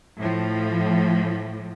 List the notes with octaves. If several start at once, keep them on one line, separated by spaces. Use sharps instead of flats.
A2 F3